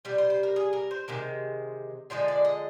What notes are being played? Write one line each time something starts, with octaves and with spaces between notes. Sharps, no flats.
C3 G3 C5
C5
C5
A#4
G#4
A#4
C5
C3 D#3 G#3
D3 F3 G#3 C5
D5
D#5